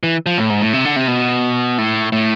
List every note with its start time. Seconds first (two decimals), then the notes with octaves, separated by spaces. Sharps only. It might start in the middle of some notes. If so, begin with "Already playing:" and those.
0.03 E3
0.26 F3
0.38 A2
0.50 G#2
0.62 A2
0.73 C3
0.85 D3
0.96 C3
1.08 B2
1.78 A2
2.12 A2